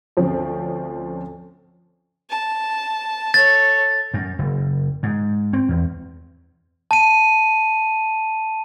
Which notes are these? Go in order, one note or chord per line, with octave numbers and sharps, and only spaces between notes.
D2 F3 C4 C#4
A5
A4 C#5 A6
F#2
F#1
G#2
C4
E2
A5 D#7